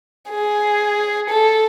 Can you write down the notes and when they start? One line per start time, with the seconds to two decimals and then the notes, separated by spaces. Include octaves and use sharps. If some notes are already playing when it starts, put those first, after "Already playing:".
0.31 G#4
1.30 A4